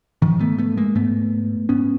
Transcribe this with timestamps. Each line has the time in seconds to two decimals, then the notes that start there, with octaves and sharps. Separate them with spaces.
0.22 G#2 D#3 F3
0.40 A3 B3
0.58 A3 B3
0.77 G#3 A#3
0.95 G#2 A3 B3
1.69 G#2 B3 C#4